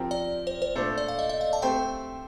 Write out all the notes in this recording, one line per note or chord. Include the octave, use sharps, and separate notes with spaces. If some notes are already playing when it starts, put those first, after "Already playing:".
Already playing: F3 C4 G4 A#4
D5
C5
C5
A#2 A3 D4 A4 C5
D5
F5
D#5
D#5
F5
A5
A3 C4 G4 C5 G5